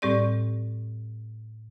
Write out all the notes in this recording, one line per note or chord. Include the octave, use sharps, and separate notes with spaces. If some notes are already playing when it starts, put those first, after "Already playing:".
A2 G3 C4 G4 D5